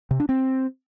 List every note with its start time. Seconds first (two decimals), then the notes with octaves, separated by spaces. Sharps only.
0.11 C3
0.20 D4
0.29 C4